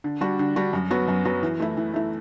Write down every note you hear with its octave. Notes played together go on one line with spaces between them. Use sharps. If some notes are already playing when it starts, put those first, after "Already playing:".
D3
G3 D4 F#4
D3
G3 D4 F#4
F#2
F#3 B3 F#4
F#2
F#3 B3 F#4
E3
A3 E4
E3
A3 E4